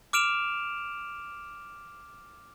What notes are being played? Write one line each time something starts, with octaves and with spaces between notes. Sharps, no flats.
D6 F6 D7 E7 F7